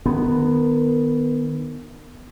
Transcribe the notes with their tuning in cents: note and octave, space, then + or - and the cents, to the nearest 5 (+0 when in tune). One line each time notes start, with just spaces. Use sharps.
D#3 -25 B3 +0